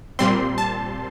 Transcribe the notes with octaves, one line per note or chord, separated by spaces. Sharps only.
A#2 G3 C4 C6
A5